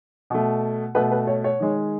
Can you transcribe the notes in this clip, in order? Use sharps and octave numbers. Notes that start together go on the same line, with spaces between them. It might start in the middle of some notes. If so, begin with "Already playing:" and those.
B2 A3
B2 A3 B4
B4
C#5
C#5
D#3 G#3